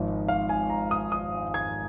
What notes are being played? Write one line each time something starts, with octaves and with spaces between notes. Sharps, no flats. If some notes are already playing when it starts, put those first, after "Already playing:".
Already playing: G#1 G#2 F3 D#5
F5
G#5
A#5
D#6
D#6
G#6